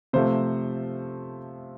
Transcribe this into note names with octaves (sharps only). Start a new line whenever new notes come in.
C3 F3 A3 C5